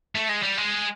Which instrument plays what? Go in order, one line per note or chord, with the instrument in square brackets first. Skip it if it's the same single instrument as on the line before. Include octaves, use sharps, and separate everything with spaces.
[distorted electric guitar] A3
G#3
G3
G#3